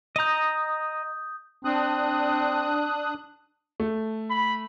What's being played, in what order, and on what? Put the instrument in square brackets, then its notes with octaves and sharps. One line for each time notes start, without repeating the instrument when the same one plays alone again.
[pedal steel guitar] D#5 A#5 [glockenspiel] D#6 G6
[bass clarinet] C4 [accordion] D4 D#6 F#6
[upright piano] A3
[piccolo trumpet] B5